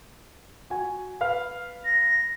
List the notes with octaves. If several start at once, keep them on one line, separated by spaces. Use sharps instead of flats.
F#4 G#5
B4 F5 F6
A#6